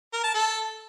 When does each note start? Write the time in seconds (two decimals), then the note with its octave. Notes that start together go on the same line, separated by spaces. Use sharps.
0.13 A#4
0.24 A5
0.34 A4